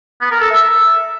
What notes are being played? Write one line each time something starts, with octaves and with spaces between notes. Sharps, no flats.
B3
A#4
A4
E5